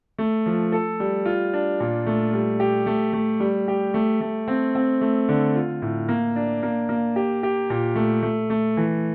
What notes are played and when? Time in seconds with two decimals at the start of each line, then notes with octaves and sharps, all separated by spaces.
0.18 A3
0.46 F3
0.72 A4
1.00 G3
1.25 F4
1.53 D4
1.80 A#2
2.06 A3
2.33 G3
2.60 G4
2.86 A3
3.13 A3
3.40 G3
3.68 G4
3.94 A3
4.21 A3
4.48 C4
4.75 C4
5.01 A3
5.29 D3
5.56 F4
5.82 A2
6.09 A#3
6.36 D4
6.63 A#3
6.89 A#3
7.16 G4
7.43 G4
7.70 A#2
7.96 A3
8.23 A3
8.50 A3
8.77 E3